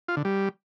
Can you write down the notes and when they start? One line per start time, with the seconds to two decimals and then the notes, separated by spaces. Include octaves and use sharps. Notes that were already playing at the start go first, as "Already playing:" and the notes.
0.08 F4
0.17 D3
0.25 G3